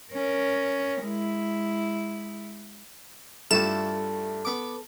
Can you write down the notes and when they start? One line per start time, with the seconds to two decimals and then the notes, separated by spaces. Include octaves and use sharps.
0.13 C#4 A#4
1.02 G#3 E4
3.51 G2 A3 E4 F4 G4 A4 E7
4.45 B3 D6